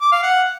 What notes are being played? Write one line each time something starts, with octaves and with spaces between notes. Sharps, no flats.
D6
F5
F#5